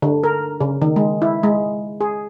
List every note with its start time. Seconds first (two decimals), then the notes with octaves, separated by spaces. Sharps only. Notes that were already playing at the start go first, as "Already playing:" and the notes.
0.02 D3
0.24 A#4
0.61 C#3
0.82 D#3
0.96 G#3
1.22 E4
1.43 G#3
2.01 G#4